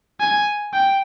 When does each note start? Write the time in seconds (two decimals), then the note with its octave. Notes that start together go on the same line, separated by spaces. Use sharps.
0.20 G#5
0.73 G5